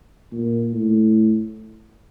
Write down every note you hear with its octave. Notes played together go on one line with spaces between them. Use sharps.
A#2
A2